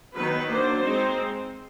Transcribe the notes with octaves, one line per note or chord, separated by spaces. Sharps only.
D#3 F#3 B3 D#4 B4
F#3 A#3 D4 C5
G#3 C4 D#4